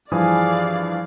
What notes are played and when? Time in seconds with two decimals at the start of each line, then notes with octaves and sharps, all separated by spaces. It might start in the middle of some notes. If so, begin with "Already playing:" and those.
0.11 G2 E3 F3 G#4 D5 F5